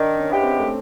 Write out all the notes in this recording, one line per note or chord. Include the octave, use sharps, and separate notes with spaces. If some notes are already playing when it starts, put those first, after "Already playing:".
Already playing: D#3 D4
C#4
G#3 B3 E4 G4
C4
A3